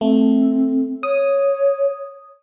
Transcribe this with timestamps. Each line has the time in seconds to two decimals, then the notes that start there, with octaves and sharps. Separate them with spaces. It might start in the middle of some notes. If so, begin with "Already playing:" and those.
0.01 A3 C4
1.03 C#5 D#6